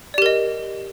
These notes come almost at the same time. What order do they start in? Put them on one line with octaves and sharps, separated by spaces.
D5 G4 A#4 D#5